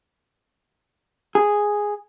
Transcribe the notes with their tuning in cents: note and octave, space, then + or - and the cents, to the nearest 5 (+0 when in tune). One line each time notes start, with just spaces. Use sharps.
G#4 -5